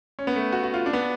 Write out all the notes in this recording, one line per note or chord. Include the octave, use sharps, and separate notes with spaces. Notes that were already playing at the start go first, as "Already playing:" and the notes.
C#4
B3
A3
F#4
F#4
F4
D4
B3